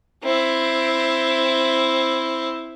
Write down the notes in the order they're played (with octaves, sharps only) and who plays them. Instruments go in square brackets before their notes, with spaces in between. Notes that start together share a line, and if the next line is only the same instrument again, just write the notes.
[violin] C4 E4